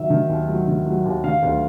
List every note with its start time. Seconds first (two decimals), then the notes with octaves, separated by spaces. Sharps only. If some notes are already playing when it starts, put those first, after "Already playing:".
Already playing: D#3 F#3 E5
0.10 D#3
0.29 D#2
0.49 F#3
0.68 D#3
0.86 F#3
1.05 D#2
1.24 D#3 F5
1.42 D2